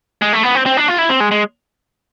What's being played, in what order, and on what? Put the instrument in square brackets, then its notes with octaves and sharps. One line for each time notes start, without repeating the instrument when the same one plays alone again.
[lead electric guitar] G#3
A3
B3
C4
C4
D4
F4
E4
C4
G#3
G#3